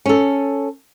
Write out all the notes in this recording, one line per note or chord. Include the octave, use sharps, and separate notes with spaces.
C#4 A4